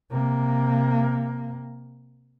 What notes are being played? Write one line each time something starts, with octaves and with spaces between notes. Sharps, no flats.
C3 A#3